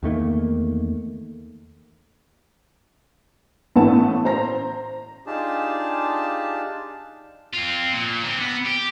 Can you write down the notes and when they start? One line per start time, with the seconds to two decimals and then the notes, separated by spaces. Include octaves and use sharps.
0.03 E2 D#3 A3 A#3
3.76 A1 A2 E3 A3 B3 A5
4.25 C5 A#5 A#6
5.27 D4 D#4 F4 G4 G#4 A5
7.54 C4 F4
7.92 A#2
8.22 D3 C4
8.40 B3
8.65 G4